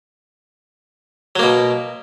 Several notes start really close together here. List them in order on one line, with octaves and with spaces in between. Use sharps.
F#3 A#3 B2